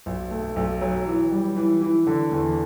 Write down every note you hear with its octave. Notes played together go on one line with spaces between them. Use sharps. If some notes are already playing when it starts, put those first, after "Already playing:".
B1
A3
B1
F#3
E3
G3
E3
E3
D3
E2